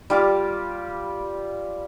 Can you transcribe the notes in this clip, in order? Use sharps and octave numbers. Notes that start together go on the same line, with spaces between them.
G3 F4 G4 D6